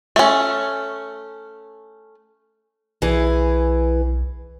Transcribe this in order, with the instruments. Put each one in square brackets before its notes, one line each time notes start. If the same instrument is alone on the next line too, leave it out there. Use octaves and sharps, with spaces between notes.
[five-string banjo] A3 C#4
[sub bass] B1 [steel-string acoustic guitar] E3 G#4